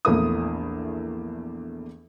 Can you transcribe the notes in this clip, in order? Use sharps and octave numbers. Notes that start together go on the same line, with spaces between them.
A#1 E2 A3 A#3 E4 D#6